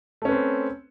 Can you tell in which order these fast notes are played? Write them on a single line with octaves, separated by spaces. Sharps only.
A3 C#4 B4 C4